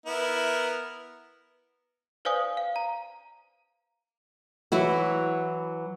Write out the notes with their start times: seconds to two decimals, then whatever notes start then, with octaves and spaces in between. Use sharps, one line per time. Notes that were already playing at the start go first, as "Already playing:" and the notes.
0.06 B3 E4 A#4
2.25 B4 C5 D5 F5 G#5 D#6
2.57 F5
2.76 A#5
4.72 E3 F#3 E4 F#4